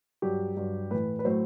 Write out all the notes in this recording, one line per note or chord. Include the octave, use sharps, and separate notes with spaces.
G2 F#3 G4
G2 F#3
A2 E3 B4
B4
A2 F#3 C5